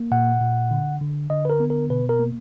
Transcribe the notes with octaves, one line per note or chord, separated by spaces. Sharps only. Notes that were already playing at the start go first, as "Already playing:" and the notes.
Already playing: A#3
A#2 F#5
A#2
D3
D3
D3 D#5
B4
A#4
B3
A#4
B2 B4
A#4
A#3